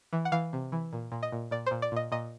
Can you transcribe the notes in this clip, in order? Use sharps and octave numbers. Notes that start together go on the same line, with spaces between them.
E3
F#5
E3 F5
C3
E3
A#2
A#2
D#5
A#2
A#2 D5
A#2 C5
D5
A#2 D#5
A#2 D#5